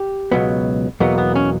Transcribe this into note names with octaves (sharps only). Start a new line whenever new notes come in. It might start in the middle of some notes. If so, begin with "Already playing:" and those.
Already playing: G4
C#2 B2 F#3 B3
E2 B2 F#3 A#3 B3
B3
C#4